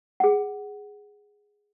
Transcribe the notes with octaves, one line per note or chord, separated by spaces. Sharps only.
G#4 F#5